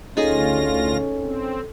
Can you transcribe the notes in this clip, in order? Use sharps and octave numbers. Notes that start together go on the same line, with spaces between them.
D2 C#4 D#4 F4 G#4 A4 A#6
C4